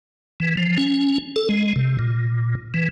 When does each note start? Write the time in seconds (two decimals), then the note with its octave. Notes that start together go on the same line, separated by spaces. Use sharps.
0.40 E3
0.57 F3
0.78 C#4
1.36 A4
1.49 G#3
1.76 C3
1.99 A#2
2.74 E3